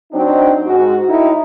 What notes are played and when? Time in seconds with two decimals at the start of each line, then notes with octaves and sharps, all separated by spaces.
0.12 F#3 C4 D4 D#4
0.65 G#2 F#4
1.08 A2 D#4 E4